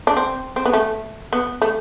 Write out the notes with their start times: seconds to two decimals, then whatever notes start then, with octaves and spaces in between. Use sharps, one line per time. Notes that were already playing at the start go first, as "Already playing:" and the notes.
0.07 D4
0.17 C4
0.56 C4
0.66 B3
0.73 A3
1.33 B3
1.62 A3